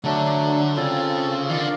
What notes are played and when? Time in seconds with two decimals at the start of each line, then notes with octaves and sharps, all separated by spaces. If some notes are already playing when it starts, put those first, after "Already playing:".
0.04 D3 F#3 A3 D4
0.76 C#3 C4 F4 A4
1.49 D#3 F4 A#4 D5 F5
1.58 D3